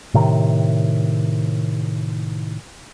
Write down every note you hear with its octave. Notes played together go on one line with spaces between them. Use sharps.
A2 C3 D#3